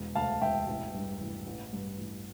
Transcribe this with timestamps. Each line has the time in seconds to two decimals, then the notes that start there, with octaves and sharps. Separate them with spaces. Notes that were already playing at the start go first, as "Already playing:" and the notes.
Already playing: E1
0.15 D2 F5 A5
0.41 E1 E5 G5
0.68 A1
0.94 G2
1.21 A1
1.47 A1
1.73 G2
1.98 A1